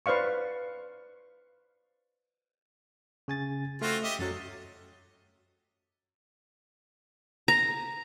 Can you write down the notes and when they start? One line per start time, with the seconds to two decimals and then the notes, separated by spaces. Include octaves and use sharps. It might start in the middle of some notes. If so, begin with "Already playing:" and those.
0.06 B4 C5 D5 F5 C#6
3.28 C#3 G#5 A6
3.82 A3 C4 F4 F#4
4.03 G4 D#5 E5
4.19 F#2 F#3 A4
7.48 A#5